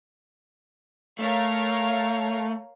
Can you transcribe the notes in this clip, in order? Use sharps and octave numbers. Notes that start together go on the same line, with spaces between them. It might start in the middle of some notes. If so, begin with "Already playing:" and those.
A3 A#4 C#5 F5